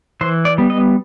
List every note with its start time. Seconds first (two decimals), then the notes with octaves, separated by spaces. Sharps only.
0.21 E3 C5
0.45 D5
0.58 G3 B3
0.70 D#5